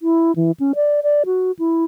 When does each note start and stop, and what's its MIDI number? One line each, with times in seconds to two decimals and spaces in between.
0.02 0.35 64
0.36 0.52 52
0.60 0.72 61
0.75 1.00 74
1.03 1.23 74
1.26 1.52 66
1.59 1.85 64